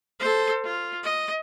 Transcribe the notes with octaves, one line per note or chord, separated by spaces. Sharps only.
A4 C5
F4
D#5